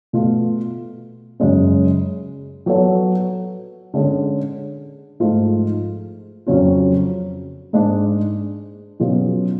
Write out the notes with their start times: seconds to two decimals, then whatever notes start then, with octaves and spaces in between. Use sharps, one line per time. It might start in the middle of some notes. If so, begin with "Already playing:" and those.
0.13 B2 A3 F4
1.40 F#2 C#3 G#3 C#4
2.66 F#3 B3 F#4 A4 C#5
3.94 D3 G#3 C#4 G#4
5.20 G#2 F3 A3 F4
6.47 F2 C#3 F#3 C#4 F4
7.73 G#2 G#3 D4
9.00 B2 F#3 C#4 F4 G#4